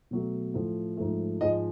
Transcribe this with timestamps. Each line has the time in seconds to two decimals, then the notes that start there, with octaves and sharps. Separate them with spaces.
0.11 B2 F#3 A3
0.54 A2 F3 A3
0.97 G#2 F3 A3
1.41 G#2 F3 G#3 D#5